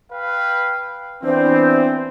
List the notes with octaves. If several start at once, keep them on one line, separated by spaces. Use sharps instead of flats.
B4 F5 G5
E3 B3 C4 D4 C5